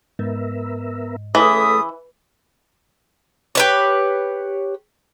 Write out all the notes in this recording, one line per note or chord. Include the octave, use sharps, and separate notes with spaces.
G#2 B3 A#4 E5
C#3 E3 A3 A4 B4 E5 D#6
G4 B4 C#5